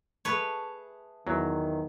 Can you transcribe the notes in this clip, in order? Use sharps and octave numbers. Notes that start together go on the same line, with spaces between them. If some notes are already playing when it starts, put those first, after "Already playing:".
G#4 B4 C#5 E5 A5
E2 D#3 F#3